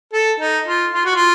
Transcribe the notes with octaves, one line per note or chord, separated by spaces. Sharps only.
A4
D#4
F4
F4
F#4
F4